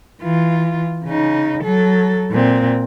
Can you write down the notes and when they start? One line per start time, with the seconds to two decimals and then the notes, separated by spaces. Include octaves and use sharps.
0.21 E3 F4
1.05 C#3 D#4
1.64 F#3 A4
2.31 A#2 C4